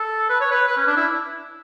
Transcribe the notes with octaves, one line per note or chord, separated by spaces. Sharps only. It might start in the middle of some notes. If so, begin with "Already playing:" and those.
Already playing: A4
B4
C#5
B4
B4
C#4
D4
E4